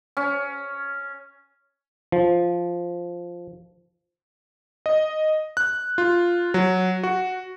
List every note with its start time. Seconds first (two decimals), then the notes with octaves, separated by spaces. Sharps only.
0.17 C#4
2.12 F3
4.86 D#5
5.57 F#6
5.98 F4
6.54 F#3
7.03 F#4